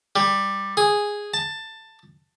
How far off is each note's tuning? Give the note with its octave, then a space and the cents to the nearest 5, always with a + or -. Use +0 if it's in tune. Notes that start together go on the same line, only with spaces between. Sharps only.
G3 +10
G#4 -5
A5 +15